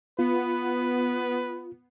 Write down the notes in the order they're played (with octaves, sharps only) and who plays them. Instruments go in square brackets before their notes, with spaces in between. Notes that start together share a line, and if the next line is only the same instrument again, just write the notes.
[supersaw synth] B3 [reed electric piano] F4 [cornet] B4